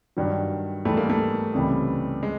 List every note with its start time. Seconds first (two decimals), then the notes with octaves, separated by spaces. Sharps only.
0.17 G2 D#3 F#3
0.85 G#2 E3 G3 A3
0.97 A#3
1.10 A3
1.54 C#2 C3 E3 G3
2.23 G#3